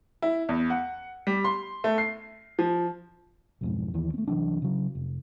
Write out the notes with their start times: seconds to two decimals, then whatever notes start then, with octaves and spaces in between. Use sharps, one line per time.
0.22 E4
0.49 E2
0.70 F#5
1.27 G3
1.44 C6
1.84 A3
1.98 C7
2.59 F3
3.61 B1 F2 G#2
3.94 D#2 D#3 E3
4.14 A3 C4
4.28 C2 E3 F#3 D4
4.62 C#3 F#3
4.95 F1